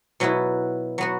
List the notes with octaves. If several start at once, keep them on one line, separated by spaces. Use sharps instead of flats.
B2 F#3 B3 E4
F#3 B3 F#4